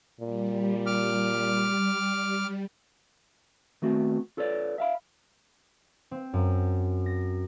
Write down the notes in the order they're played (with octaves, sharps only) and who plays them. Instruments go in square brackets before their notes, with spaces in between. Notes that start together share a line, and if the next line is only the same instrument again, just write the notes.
[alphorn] A#2 [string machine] G3
[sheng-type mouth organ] D6 F6
[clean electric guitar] D#3 A3 B3 C4 F#4
F4 A4 B4 C#5 D5
E5 F5 B5
[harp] C4
F#2
A#6